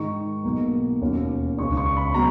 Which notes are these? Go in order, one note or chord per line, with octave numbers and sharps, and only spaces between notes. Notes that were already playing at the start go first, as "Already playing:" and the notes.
Already playing: G#2 D#3 G#3 D#4 C#6
B1 B2 A#3
E1 D#2 D#3 F#3 C#4
C#2 C#3 G#3 C#4 C#6
C#6
B5
B2 F#3 A#5